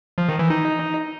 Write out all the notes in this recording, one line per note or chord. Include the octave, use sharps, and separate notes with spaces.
F3
D#3
E3
D#4